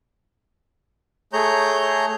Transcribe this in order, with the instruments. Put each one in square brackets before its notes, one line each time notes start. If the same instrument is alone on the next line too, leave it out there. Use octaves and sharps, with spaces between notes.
[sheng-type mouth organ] A3 G#4 C#5 A#5 G6